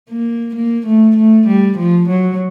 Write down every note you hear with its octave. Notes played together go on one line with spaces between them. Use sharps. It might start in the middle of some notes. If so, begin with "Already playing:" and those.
A#3
A#3
A3
A3
G3
F3
F#3